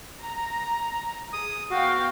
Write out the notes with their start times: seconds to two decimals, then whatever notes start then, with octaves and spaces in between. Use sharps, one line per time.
0.22 A#5
1.33 G#4 D#6
1.71 B3 F#4 F5 G5